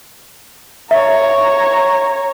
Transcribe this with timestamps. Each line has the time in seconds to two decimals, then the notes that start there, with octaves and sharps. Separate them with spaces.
0.91 C#5 E5 A#5